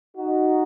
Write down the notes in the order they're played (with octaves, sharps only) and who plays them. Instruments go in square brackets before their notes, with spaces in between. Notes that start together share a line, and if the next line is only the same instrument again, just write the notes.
[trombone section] D#4 F#4